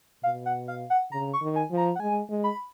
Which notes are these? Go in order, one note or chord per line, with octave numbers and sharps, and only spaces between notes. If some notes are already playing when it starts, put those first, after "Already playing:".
B2 F5
F#5
F5
F#5
C#3 A#5
C#6
D#3
G#5
F3
A#5
F#5
G#3 G#5
G#3
B5